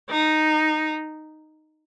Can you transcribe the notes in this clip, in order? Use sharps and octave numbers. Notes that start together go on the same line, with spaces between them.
D#4